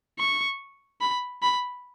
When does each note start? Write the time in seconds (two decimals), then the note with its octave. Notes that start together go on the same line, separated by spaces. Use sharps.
0.19 C#6
1.01 B5
1.42 B5